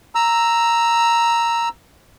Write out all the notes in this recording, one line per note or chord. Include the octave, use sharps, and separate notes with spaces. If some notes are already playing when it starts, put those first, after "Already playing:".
A#5 E6